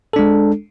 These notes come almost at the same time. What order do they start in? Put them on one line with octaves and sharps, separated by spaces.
A4 D4 G#3